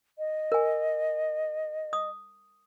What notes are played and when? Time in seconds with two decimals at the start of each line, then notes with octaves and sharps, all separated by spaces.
0.18 D#5
0.52 A#4 G#5
1.93 D#6